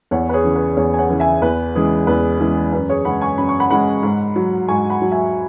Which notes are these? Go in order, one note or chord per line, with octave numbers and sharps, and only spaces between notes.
E2 C#5 F#5
B4
G#4 C#5
C#3 E3
B4
E2 G#4 C#5
G#5
C#5 F#5
C#3 E3
E5 G#5
E2 B4
C#3 E3 G#3 G#4
E2 B4
C#3 E3 G#3
F#2 B4
G#4 C#5
C#3 G#3 F#5 B5
G#5 C#6
F#2 B5
C#6
F#5 B5
C#3 G#3 F#5 B5
G#2
F#3
G#2 G#5 C#6
F#5 B5
F#3
E5 G#5